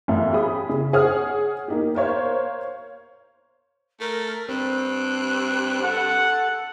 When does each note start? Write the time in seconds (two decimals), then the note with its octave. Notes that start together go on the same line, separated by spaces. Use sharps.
0.08 A1 F#2 A3 B3 F5
0.33 G4 G#4 B5 D#6
0.69 C#3
0.93 G#4 C#5 F#5 D#6 F6
1.68 A#3 D#4 G4
1.95 A#4 C5 C#5 F5
4.00 A3 A#4
4.49 G2 C4 F#6
5.84 A4 F#5